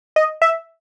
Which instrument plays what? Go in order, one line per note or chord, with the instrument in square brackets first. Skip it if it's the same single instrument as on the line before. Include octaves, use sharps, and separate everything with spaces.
[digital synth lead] D#5
E5